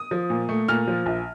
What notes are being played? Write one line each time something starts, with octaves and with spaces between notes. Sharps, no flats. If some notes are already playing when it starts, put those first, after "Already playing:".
Already playing: D#6
F3
A#2
A3
A#2 F6
F3
A#1